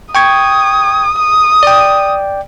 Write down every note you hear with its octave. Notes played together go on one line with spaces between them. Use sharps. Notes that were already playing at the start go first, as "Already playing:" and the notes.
G5 C#6 D#6 G#6
D#6
D5 G5